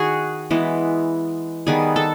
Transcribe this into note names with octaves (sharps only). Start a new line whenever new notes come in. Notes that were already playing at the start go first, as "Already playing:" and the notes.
Already playing: D#3 F#4 G#4
E3 G#3 B3
D#3 G3 B3 G#4
A4